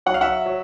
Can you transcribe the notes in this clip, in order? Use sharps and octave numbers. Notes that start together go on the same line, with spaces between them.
F#3 F#5
F5
E5 F#5
F#3